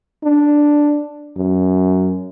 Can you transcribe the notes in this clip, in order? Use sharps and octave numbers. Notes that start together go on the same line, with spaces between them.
D4
F#2